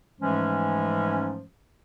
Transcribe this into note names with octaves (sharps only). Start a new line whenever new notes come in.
G#2 E3 F3 G#3 A3 C#4